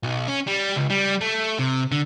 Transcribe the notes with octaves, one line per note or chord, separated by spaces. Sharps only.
B1
C#4
G3
C#2
G3
A3
C3
D3